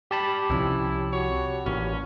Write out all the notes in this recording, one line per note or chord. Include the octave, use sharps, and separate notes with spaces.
G3 G4 A5 B5
C2 C3 F3 C#4 E4
F#4 C#5
A1 A#2 C#4